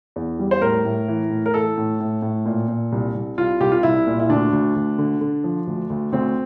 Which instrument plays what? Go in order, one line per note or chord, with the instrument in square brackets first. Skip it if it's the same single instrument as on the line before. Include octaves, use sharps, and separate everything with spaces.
[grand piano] E2
G3
C5
A2 A#4
A2
E3
A2
A#4
E3 A4
A2
A2
A2
A#2
A#2
C2
C2
C2 F4
C2 G4
F4
C2 E4
A#2
E4
D2 D4
D2
D2
D3
D3
F3
D2
D2
D2 C4